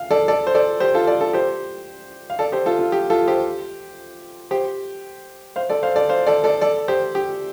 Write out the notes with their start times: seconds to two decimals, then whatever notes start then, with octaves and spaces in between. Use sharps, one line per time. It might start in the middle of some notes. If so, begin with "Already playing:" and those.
Already playing: F5
0.11 A4 D5
0.28 A4 D5
0.47 C5
0.54 A4 D5
0.80 G4 C5
0.94 F4 A4
1.07 A4 D5
1.21 F4 A4
1.33 G4 C5
2.30 F5
2.39 A4 D5
2.52 G4 C5
2.66 F4 A4
2.79 F4
2.92 G4
3.10 F4 A4
3.28 G4 C5
4.51 G4 C5
5.56 C5 F5
5.70 A4 D5
5.83 C5 F5
5.96 A4 D5
6.09 C5 F5
6.27 A4 D5
6.44 A4 D5
6.61 A4 D5
6.88 G4 C5
7.15 G4